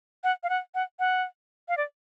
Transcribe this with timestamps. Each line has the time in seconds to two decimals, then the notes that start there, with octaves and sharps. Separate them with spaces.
0.24 F#5
0.43 F5
0.50 F#5
0.75 F#5
0.99 F#5
1.69 F5
1.77 D5